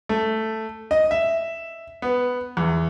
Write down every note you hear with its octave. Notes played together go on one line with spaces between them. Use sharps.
A3
D#5
E5
B3
E2